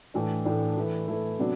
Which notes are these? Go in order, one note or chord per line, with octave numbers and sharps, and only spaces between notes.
A2 E3 A3 D4
A2 E3 A3 D4
E3 A3 E4 B4
E3 A3 E4 B4
C3 F#3 B3 D4